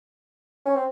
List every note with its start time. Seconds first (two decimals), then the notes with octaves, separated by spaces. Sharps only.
0.66 C#4
0.75 C4